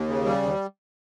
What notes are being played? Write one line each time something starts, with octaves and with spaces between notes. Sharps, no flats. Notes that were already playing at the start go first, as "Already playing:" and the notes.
Already playing: D#2
C#3
G3
D#2